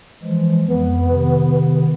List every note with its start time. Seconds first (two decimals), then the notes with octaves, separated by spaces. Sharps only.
0.23 E3 F3 G#3
0.67 F2 B3
1.08 C3 D#3